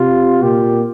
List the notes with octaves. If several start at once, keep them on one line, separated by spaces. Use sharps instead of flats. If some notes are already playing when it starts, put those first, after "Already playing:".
Already playing: C3 F4
A#2 G4